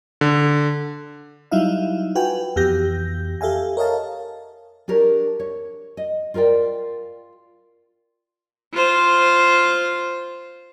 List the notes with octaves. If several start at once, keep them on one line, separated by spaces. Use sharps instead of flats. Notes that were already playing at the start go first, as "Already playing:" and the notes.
D3
F#3 G3 D#4 E4 E5 F5
F4 F#4 B4 G5 G#5
F2 E3 B3 G4 G6 A#6
G4 A4 E5 F5 G#5
A#4 C#5 D#5 F5 A5
D4 G4 A#4 C#5
C#5
D#5
F4 A#4 B4 D5 G5
F4 C5